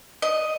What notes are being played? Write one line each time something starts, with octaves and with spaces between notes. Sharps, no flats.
D#5